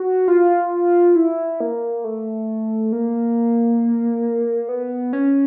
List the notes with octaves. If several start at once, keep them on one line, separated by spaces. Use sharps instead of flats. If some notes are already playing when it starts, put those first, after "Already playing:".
Already playing: F#4
F4
E4
A#3
A3
A#3
B3
C#4